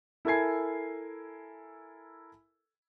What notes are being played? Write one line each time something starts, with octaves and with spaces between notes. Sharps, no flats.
E4 A4 A#4 G#5 G#6 C7